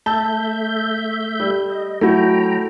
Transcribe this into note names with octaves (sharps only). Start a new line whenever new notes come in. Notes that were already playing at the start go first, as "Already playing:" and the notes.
A3 E5 A5 G6
G3
D#5
F#3 A3 E4 F#4 G5 A#5